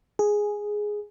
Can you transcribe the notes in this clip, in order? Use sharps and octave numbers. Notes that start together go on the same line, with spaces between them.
G#4